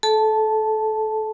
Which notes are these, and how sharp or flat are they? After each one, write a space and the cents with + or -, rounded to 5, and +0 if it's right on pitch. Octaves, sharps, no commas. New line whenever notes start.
A4 -25 A5 -5